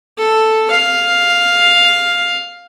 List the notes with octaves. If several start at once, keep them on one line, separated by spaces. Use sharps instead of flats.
A4
F5